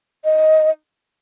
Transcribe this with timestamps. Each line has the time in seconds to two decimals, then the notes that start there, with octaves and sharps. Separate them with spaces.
0.25 D#5